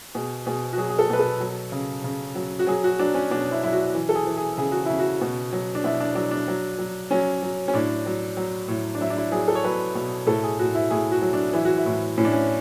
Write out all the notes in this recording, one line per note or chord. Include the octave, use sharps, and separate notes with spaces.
B2 G#4
B2 G#4
F#4
F#3 G#4
G#4
A4
B2 B4
A4
F#3
C#3
C#3
F#3
F#4
F#3 G#4
F#4
F#3 D4
C#4
B2 D4
E4
F#3 E4
F#4
E3
A4
G#4
E3
G#4
C#3 G#4
F#4
C#3 E4
F#4
B2
F#3
D4
B2 E4
D4
F#3 D4
D4
F#3
F#3
F#3 C#4
F#3
C#4
A2 D4
F#3
F#3
A2
D4
F#3 E4
D4
E4
F#3 G#4
A4
C#5
F#3 B4
B2
A2 A4
G#4
A2 F#4
E4
A2 G#4
F#4
F#3
D4
E3 E4
F#4
E4
A2
A2 C#4
D4
C#4